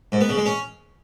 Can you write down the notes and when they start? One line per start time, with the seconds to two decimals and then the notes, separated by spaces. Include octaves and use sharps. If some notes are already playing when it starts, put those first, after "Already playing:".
0.12 G#2
0.21 B3
0.29 C#3
0.37 G#3
0.46 C#4